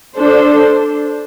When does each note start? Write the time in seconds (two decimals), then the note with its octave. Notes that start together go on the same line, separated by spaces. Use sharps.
0.16 D4 A4 C5